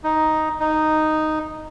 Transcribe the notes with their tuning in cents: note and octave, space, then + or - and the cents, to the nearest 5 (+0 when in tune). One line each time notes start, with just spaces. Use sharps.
D#4 +5
D#4 -5